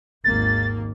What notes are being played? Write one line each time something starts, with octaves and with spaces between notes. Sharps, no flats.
G#1 D#2 A#3 A6